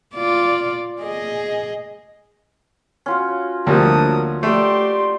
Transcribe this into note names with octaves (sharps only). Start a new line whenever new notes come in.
F4 D5
G#4 D#5
C#4 F4 F#4
D2 C3 F3 G3 A#3 D4 A5 D#6
A3 G4 D5 C6